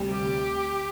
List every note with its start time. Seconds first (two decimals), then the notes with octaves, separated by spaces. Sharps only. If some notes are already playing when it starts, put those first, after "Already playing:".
Already playing: D2 C3 G3
0.10 G4